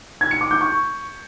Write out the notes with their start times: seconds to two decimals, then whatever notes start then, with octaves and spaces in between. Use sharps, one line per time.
0.21 G#6
0.31 C#7
0.41 D6
0.51 G6
0.61 C#6